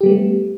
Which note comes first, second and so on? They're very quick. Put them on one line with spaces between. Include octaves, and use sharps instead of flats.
G4 G3 B3 A3